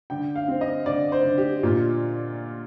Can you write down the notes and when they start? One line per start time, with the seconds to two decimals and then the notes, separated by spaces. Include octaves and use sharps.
0.10 D3 G5
0.36 F5
0.48 C4
0.61 D#5
0.86 D3 D5
1.12 C5
1.24 D3
1.38 G4
1.63 A#2 F4